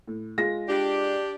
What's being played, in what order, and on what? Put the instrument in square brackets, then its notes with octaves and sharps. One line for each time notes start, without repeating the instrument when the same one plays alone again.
[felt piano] A2
G#3 F4 A#6
[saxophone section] D4 G4